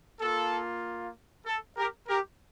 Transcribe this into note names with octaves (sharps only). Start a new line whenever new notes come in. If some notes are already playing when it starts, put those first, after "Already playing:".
A#3 F4 A4
A4
G4 A#4
G4 A#4